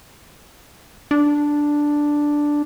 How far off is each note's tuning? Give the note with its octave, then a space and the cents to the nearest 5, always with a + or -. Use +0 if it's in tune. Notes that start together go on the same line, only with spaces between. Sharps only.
D4 +0